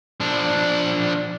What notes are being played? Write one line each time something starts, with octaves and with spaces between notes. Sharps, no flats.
F3 D4